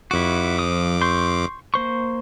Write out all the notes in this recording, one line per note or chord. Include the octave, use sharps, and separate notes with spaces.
F2 E4 F#4 D6
F3 D#6
C6 C#6 G6
A#3 C5 C#6